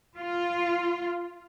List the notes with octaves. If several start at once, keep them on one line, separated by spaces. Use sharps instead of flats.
F4